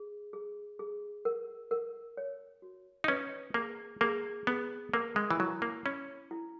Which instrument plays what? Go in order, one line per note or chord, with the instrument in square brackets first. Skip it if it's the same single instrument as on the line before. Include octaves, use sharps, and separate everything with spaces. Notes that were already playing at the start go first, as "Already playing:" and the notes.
Already playing: [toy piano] G#4
G#4
G#4
A#4
A#4
C#5
F#4
[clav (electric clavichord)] D#4
[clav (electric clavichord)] C#4 [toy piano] B4
[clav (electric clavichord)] A#3 [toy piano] G#4
[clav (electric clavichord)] A#3 [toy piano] G#4
[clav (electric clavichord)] B3 [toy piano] G#4
[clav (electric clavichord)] A#3 [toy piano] A#4
[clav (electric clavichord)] G#3
E3
[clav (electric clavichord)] F#3 [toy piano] E4
[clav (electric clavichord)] A#3
[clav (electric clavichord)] C#4 [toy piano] B5
[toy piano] E4